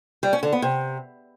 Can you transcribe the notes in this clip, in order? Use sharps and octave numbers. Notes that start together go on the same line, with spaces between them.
G3
C#4
D3
B3
C3